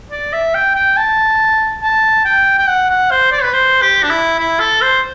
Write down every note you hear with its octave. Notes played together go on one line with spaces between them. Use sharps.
D5
E5
G5
G5
A5
A5
G5
G5
F#5
F#5
C5
D5
B4
C5
G4
D4
E4
E4
A4
C5